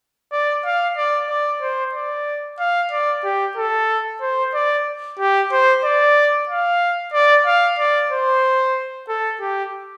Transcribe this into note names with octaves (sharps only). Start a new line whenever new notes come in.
D5
F5
D5
D5
C5
D5
F5
D5
G4
A4
C5
D5
G4
C5
D5
F5
D5
F5
D5
C5
A4
G4